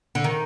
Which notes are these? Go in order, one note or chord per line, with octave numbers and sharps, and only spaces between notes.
D3
D#3